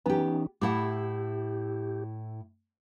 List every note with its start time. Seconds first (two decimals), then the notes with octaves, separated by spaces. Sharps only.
0.06 E3 B3 C#4 D#4 G4
0.62 A2 E4 G4 F#5